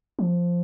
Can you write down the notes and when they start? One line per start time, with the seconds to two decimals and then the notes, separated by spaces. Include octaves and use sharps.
0.19 F3